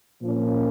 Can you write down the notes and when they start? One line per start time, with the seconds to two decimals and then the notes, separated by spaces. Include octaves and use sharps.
0.22 A#2 F3 A#3 C#4